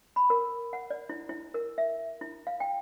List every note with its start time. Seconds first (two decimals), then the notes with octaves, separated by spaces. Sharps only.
0.16 B5
0.30 A#4
0.73 F#5
0.90 D5
1.09 E4
1.29 E4
1.54 A#4
1.78 E5
2.21 E4
2.47 F5
2.60 G5